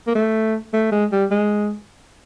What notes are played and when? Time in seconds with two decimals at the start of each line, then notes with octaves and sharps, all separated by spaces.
0.07 A#3
0.15 A3
0.73 A3
0.92 G#3
1.12 G3
1.31 G#3